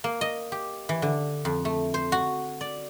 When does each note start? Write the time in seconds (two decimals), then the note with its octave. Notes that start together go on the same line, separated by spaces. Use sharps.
0.04 A#3
0.21 D#5
0.52 G4
0.89 E3
1.02 D3
1.45 F2
1.65 A3
1.94 C5
2.12 F#4
2.61 D5